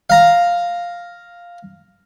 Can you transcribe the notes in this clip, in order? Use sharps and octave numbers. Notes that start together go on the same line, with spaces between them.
F5 A#5